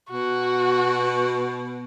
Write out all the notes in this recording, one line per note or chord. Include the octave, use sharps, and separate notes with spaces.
B2 F#4